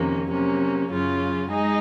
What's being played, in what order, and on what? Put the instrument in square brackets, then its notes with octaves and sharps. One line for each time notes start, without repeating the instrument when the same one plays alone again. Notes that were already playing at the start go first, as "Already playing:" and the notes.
Already playing: [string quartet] F2 C3 D#3 A#3 C#4
C3 F#3 A#3 C#4
F#2 C#3 F#3 C#4 F4
G#3 D#4 G#4 D#5